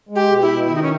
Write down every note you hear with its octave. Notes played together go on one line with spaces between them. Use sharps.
G#3
G4
B2
E4
B2
D#3 E4
D#4
C#4